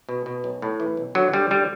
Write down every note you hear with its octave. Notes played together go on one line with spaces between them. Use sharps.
B2
B2
B1
A2
E3
B1
D3 F#3
D3 G3
D3 G3